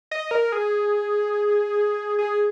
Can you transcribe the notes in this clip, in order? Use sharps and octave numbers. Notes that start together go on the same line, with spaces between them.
D#5
A#4
G#4
G#4